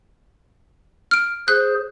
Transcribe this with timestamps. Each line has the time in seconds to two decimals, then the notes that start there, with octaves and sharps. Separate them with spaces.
1.11 F6 D7
1.48 G#4 C5 F#6